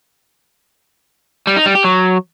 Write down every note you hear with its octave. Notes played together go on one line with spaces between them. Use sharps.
G3
D#4
G3
G4
F#3